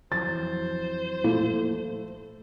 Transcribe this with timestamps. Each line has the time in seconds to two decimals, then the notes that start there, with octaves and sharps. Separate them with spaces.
0.12 F2 E3 F#3 C5 A6
1.24 A#2 A3 A#3 E4